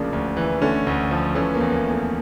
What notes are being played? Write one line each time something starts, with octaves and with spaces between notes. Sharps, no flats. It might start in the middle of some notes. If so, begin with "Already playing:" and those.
Already playing: D2 C#3 F3 A#3 D4
D2
E3
D3 A3 C#4
D2
F3
E3 A3 C#4
A#3
E2
A#3
E2
A3